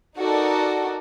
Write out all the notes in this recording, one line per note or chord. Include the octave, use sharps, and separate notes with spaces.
D#4 F#4 A4 A#4 D5